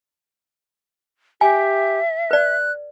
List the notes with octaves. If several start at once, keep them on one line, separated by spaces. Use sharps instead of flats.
G4 E5 G#5
B4 D5 F#6